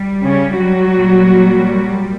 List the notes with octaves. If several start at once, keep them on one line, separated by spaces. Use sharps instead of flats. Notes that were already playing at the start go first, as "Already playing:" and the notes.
Already playing: G3
C#3 C#4
F#3 F#4
A#2 G3